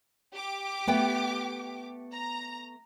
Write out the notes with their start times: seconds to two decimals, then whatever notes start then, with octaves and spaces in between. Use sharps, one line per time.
0.33 G4 D6
0.87 A3 B3 G5
2.13 A#5